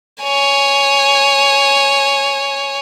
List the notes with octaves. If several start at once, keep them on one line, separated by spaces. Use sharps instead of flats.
C#5 G#5